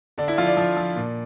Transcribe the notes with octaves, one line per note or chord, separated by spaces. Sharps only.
D3 D4
E4
F3 F4
D5
F3
F3
A#2